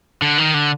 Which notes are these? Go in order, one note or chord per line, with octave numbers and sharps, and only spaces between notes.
D3
D#3
D3